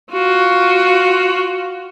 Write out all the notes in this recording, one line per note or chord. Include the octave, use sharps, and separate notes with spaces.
F4 F#4